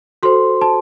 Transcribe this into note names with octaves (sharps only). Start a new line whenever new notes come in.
F#4 A4 C5 C6
A5